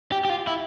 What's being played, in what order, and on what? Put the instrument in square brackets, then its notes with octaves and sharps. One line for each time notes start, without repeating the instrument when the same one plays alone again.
[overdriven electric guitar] G4
G4
F4
E4